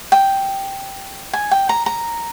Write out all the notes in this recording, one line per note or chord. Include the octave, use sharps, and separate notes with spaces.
G5
G#5
G5
A#5
A#5